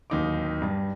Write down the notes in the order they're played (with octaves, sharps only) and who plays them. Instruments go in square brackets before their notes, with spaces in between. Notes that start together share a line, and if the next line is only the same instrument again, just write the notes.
[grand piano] D1 D#2 D#4 D6
G2